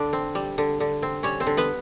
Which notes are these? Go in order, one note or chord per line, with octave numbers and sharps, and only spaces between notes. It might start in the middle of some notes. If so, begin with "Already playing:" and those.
Already playing: D3 D4 D5
C4
G3
D3
D3
C4
G3 C#4 C#5
C4 C5
D3
B3 B4